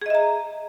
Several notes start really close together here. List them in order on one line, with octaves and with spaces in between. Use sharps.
G#4 D#5 E5 A#5